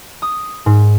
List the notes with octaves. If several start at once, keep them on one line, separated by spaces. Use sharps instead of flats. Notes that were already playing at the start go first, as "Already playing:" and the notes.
D#6
G#2